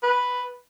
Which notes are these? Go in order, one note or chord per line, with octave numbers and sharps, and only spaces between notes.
B4